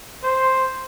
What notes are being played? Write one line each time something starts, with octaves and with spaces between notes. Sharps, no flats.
C5